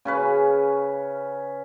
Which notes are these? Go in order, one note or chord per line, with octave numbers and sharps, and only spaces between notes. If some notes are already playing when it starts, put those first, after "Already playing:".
C#3 C#4 B4